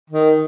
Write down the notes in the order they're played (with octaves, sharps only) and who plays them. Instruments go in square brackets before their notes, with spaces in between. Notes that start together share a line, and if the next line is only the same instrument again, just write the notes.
[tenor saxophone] D#3